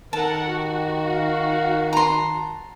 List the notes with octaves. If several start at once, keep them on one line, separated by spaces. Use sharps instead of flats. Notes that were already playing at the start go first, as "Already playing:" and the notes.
D#3 A4 A#4 F#5 A5
F#4 G4
F5
A5 A#5 C6